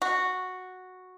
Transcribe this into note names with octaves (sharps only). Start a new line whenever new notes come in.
F#4